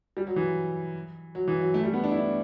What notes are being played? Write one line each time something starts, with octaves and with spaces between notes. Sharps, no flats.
G3
F#3
E3
F#3
E3
F#3
A3
G3
B3
D4
E4
D4